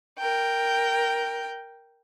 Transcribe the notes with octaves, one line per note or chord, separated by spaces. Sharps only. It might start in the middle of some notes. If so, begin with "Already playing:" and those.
A#4 G5